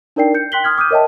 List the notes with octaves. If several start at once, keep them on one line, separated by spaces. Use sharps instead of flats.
D4 D#4 A#4 D5 G5 C7
G6 C#7
G5 C6 F#6 B6 F#7 G7
C6 D#6 F6 G#6
D6 D#6 F6 G6 D#7
A#4 C#5 D#5 E5 G5 A5